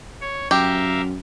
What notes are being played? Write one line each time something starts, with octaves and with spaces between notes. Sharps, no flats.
C#5
F#2 G4 A#4 E5 F5